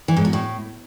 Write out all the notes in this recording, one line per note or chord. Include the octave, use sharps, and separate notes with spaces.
E3
G#2
B2
A2